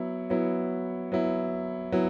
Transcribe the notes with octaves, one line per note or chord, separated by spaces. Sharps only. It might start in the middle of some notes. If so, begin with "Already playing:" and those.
Already playing: F#3 B3 E4
F#3 B3 E4
F#3 B3 E4
F#3 B3 E4